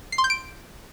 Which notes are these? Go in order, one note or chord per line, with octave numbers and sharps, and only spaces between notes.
C7
C6
G6
D7